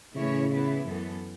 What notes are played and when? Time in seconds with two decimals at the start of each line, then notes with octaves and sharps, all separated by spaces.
0.15 A2 C#3 E3 C#4 E4 C#5
0.49 E3 B3 E4 B4
0.84 F#2 E3 B3 A4